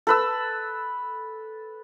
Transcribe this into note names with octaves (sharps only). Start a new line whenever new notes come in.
A4 B4 E6